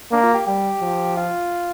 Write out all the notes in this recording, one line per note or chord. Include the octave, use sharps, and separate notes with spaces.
A#3 D4
F4
G4
G3 G4
F3
F4